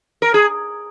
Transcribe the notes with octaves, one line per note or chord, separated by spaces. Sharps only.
A#4
G#4